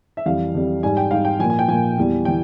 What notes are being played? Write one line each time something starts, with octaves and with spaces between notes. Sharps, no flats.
E5
F2 E3 G3 F5
F2 E3 G3
G#2 G3 G#5
G5
G#2 G3 F5
G5
A#2 F3 G#5
G#5
G5
A#2 F3 G#5
E2 E3 G3
E3 G5